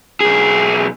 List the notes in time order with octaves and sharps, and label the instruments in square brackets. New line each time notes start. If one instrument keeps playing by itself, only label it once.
[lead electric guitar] B1 G#4